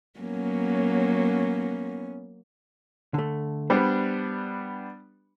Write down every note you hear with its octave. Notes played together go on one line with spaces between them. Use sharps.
F#3 A#3 B3 C#4
D3 A3
G3 B3 D4 C5